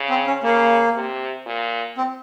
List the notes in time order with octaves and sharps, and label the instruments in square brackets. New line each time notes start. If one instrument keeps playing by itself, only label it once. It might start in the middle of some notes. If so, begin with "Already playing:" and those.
Already playing: [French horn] C#3
[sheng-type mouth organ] C4
C#4
[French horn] C#3 [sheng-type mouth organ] A#3
[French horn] C3
A#2
[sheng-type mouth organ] C4